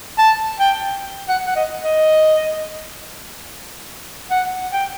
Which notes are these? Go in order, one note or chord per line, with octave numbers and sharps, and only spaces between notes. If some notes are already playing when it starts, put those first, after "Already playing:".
A5
G5
F#5
F#5
D#5
D#5
F#5
G5